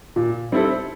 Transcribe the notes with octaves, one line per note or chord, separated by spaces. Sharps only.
A#2
G3 C4 E4 A4